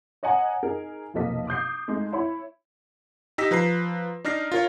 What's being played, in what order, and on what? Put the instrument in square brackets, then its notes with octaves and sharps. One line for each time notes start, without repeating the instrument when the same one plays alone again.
[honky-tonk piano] C#5 D#5 F#5 G#5 A#5
D#4 G#4 A#4
F1 B1 A#3 A4 D#5 B6
D6 D#6 G6 C7
G#3 A3 D#4
E4 C#5 B5
[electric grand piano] D#4 G4 E6 A#6 B6
F3 B4 A#5 C7
D4 D#4 F6 A#6 C7
F4 A#4 C#5